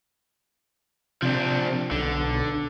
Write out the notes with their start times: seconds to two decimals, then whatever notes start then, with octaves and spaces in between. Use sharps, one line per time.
1.22 C3 F3 D4
1.91 B1 D3